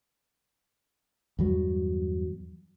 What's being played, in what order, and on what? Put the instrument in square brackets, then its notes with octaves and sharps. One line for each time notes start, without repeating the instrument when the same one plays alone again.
[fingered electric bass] E2 G2 F#3